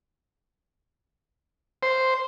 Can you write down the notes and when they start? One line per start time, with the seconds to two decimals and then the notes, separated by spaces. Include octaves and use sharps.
1.83 C5